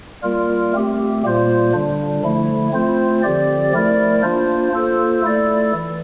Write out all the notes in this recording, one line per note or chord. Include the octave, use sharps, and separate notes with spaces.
G3 A#3 F4 A#4
A3 C4 G4
A#2 G3 A#3 F4 C5
D3 G3 D4
D3 F3 A3 E4
A3 C4 F4 C5
D3 F3 C4 G4 D5
F3 A3 E4 A#4 D5
A#3 D4 F4 C5
A#3 F4 A4 C5
A3 E4 A4 D5
E3